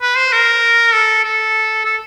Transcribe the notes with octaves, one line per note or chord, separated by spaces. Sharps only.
B4
C5
A#4
A4
A4
A4